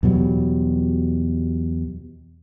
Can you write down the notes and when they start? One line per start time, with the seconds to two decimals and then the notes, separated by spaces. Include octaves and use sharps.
0.03 E2 B2 F#3 G3